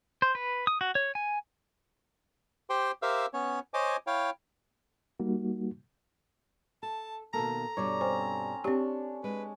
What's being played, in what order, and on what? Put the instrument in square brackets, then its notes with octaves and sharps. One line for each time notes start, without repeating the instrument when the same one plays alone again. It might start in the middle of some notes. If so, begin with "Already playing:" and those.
[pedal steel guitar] C5
B4
D#6
F#4
C#5
G#5
[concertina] G4 C5 G5 C6
G4 A#4 C5 E5 F5 E6
B3 C#4 C#5
C5 C#5 D#5 G#5 D6
E4 C#5 F5 G5
[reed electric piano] G3 A#3 D#4 F#4
[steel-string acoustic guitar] A4 [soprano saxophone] A5
[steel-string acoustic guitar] B2 D#3 A#3 [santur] A4 [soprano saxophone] A#5
[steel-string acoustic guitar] G2 B2 G3 [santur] C#5 D5
[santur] C4 C#4 [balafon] C5
[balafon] C4 G4 [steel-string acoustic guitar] D4 [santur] C#5
[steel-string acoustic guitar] G#3 [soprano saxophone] B4